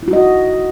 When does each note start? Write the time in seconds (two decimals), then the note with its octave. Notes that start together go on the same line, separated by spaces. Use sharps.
0.03 E4
0.08 F#4
0.13 D#5